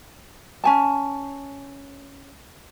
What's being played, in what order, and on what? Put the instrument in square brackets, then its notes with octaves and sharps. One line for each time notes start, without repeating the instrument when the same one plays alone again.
[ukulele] C#4 G#5 A5